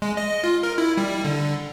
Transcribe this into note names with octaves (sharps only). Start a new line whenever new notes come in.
G#3
D#5
F4
A#4
E4
G3
D3